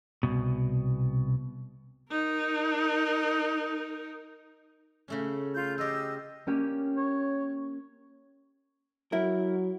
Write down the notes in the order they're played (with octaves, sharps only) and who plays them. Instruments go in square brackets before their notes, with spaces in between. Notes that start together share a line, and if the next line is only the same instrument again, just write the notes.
[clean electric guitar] C2 B2
[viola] D#4 A#4
[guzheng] C#3 A3 C#4
[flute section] F4 G6
[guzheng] F4 G4 [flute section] D#5 E6
[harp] A#3 C#4 G4
[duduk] C#5
[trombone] F#3 [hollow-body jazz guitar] E4 A#4